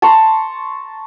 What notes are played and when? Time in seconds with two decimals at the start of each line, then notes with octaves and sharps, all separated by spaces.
0.02 A5 A#5 C6 C#6